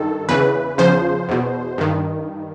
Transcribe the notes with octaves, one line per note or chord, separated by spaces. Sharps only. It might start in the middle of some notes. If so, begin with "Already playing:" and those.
Already playing: G2 D#3 A4
E2 C#3 E3 B4
E2 C#3 F3 C5
E2 B2
G2 D#3